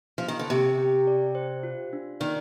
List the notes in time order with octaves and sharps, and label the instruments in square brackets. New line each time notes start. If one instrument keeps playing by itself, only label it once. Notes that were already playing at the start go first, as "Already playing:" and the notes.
[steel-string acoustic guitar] F3
D#3
D3
[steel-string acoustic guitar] C3 [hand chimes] G4
[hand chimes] G5
D5
C5
F4
D4
[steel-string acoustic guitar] D#3 [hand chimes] D5